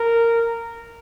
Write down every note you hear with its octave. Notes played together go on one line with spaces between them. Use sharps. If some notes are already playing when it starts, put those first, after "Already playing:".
Already playing: A#4